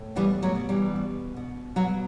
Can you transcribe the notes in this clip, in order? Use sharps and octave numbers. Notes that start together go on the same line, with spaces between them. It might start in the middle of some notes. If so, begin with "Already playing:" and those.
Already playing: A2
B2 E3 G3
F#3 A3
B2
E3 G3
B2
B2
B2 F#3